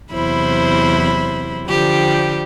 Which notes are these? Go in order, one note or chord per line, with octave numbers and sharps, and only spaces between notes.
E2 C3 F#3 E4 C5 B5
D3 F3 G3 G4